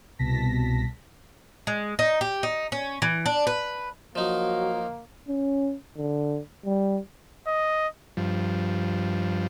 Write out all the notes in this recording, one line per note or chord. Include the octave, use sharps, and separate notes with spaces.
C2 B2 A5 A#6 B6
G#3
D#4
G4
D#4
C#4
E3
D4
B4
F3 F#3 A#3 D#4
C#4
D3
G3
D#5
G2 F3